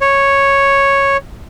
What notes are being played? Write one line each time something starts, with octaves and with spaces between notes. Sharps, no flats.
C#5